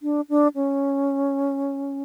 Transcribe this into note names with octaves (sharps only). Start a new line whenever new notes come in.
D4
D4
C#4